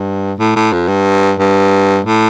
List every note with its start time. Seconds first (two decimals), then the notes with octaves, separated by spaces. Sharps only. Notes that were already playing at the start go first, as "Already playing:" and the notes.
Already playing: G2
0.39 A2
0.56 A2
0.72 F2
0.88 G2
1.39 G2
2.05 A2